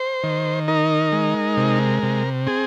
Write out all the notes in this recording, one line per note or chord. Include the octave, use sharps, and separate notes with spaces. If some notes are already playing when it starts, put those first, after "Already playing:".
Already playing: C5
D#3
D#4 A#4
G#3
C3
C3
C4 G#4